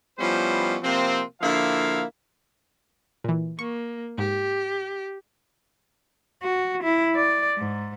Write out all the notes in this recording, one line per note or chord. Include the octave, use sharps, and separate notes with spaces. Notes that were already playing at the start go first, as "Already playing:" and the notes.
F3 G3 B3 C#4 E4 C5
C3 F3 A#3 C4
D3 F3 A#3 E4 F5
A#2 E3
A#3 C#6
G#2 G4
F#4
E4
D5
G#2